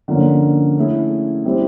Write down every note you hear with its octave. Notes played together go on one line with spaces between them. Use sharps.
D3 F3 A#3 C#4
A3 C#4 E4 G#4
G3 C4 E4 G4